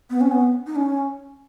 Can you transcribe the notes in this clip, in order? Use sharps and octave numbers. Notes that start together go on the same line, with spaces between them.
B3
C#4
B3
D#4
C#4